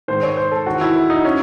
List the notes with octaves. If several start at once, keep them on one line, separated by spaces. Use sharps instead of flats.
G#2 D#3 C5
C#5
C5
A4
E2 D#3 F#4
E4
D#4
C#4